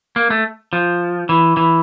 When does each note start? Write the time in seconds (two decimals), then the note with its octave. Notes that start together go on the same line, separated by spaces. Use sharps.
0.16 A#3
0.30 A3
0.73 F3
1.29 E3
1.57 E3